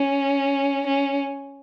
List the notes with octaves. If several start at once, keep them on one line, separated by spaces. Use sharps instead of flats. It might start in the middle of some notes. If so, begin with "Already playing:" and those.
Already playing: C#4
C#4